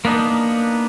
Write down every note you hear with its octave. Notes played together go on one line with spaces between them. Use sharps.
A#3 B3 D4 D#4